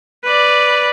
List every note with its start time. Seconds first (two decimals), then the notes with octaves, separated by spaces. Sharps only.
0.24 B4 D5